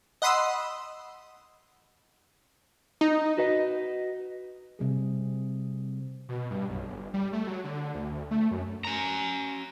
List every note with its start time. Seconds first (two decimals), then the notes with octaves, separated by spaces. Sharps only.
0.22 D#5 F#5 B5 C6 D#6 E6
3.01 D#4
3.37 F#4 B4 D#5
4.79 C3 G3 G#4
6.29 B2
6.51 G2
6.69 B1
6.89 G1
7.14 G3
7.33 A3
7.47 F#3
7.64 D3
7.95 D2
8.31 A3
8.51 F#2
8.85 C#4 A#5